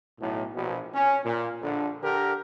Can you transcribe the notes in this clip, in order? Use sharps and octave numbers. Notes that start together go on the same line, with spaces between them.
B1 A2
A#1 B2
C#4
A#2
A#1 D3 D4 A4
D3 G4 A#4